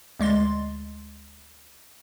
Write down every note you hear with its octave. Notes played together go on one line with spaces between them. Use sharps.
D2 G#3 C6 A6